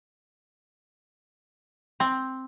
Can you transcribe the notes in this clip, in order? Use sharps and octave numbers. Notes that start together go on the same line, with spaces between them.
C4